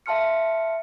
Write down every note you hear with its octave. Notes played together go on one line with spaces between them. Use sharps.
E5 F5 A5 C6 F6 C#7